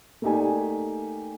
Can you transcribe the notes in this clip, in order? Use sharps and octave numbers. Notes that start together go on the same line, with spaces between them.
A3 A#3 D#4 G4 D5 G#5